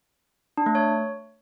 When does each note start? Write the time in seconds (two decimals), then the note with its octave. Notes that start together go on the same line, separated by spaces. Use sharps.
0.57 D4
0.66 A3
0.75 C#5